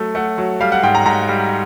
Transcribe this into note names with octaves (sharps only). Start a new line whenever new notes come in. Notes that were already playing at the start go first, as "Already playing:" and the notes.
Already playing: F#3 A3
A3 F#5
F#3
G3 F5
F#5
G#2 G5
A#5
G#2 A#5
G3